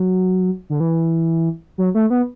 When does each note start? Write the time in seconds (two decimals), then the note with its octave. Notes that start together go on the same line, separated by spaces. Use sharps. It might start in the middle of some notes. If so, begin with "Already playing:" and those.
Already playing: F#3
0.70 D3
0.80 E3
1.78 F#3
1.95 A3
2.10 B3